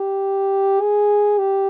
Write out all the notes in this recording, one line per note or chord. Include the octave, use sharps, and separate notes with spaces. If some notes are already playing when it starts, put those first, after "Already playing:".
Already playing: G4
G#4
G4